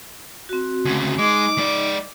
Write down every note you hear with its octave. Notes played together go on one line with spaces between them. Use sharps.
C4 F#4
D2 C#3
G#3 D#4 D#5 D6
G#3 D5